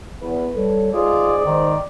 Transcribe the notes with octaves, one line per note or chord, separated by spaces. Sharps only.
E2 B4
G3 A4 C#5
G#2 F4 G#4 D5
D#3 C5